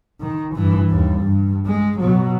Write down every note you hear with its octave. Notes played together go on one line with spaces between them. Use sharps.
D#3
G2 E3
D#2 G3
G2
G#3
B2 F#3